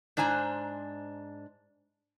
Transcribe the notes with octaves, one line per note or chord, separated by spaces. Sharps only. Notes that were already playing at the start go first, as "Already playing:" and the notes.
G#2 D4 C5 G#5 A#5